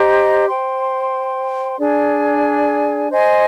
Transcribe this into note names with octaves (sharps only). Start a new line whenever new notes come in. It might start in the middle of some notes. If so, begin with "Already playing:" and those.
Already playing: G4 C5 D#5 A#5
C5 G5 C6
D4 G#4 D5 G#5
C5 D#5 G#5